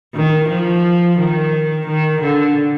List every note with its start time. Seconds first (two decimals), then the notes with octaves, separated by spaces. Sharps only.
0.15 D#3
0.49 F3
1.19 D#3
1.87 D#3
2.21 D3